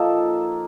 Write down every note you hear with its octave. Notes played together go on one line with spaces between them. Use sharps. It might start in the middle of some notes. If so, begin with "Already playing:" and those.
Already playing: A#2 F3 A#3 D#4 A4